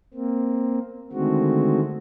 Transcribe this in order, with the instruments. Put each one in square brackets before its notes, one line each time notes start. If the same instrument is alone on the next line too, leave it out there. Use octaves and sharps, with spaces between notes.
[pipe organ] A#3 C4
D3 D#3 G#3 A3 C4 F#4